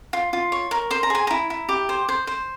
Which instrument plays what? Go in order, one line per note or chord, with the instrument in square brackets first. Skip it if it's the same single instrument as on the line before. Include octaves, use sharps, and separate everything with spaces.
[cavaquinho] F4
F4
C#5
A#4
C5 C6
A#5
G#4 G#5
E4 A#5
E4
G4
C5
C5
C5